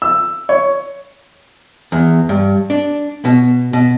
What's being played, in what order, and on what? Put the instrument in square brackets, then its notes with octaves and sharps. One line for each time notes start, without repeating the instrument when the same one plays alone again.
[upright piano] E6
C#5
[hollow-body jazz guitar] E2
G2
D4
B2
B2